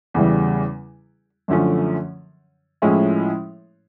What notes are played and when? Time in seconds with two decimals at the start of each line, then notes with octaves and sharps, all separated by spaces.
0.14 E2 C#3 E3 G3
1.48 F#2 D3 F3 A3 C#4
2.82 A2 F3 G#3 C#4 E4